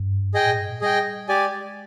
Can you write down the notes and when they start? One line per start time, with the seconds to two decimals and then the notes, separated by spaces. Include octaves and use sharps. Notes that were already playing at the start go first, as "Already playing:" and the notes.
Already playing: G2
0.34 G#2 G#4 D#5 G5
0.46 A#2
0.58 G2
0.69 A#2
0.81 G3 G#4 D#5 G5
1.29 G#3 G4 D5 G#5